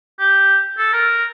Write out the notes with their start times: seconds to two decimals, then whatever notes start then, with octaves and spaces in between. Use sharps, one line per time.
0.20 G4
0.78 A4
0.93 A#4